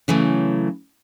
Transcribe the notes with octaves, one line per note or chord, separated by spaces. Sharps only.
C#3 E3 F#3 A3